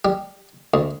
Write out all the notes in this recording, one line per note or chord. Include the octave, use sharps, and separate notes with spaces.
G3
D2